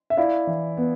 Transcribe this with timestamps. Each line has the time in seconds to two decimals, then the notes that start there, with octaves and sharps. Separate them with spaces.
0.10 E5
0.17 E4 D5 F5
0.47 E3
0.77 B3